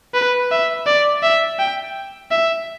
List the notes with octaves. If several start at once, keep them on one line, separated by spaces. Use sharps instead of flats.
B4
E5
D5
E5
G5
E5